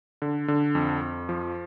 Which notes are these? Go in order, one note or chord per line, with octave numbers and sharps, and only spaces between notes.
D3
D3
F2
F2
F3